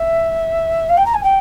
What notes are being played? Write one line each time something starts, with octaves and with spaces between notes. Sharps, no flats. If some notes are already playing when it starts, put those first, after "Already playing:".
Already playing: E5
F5
G5
A#5
G#5
G5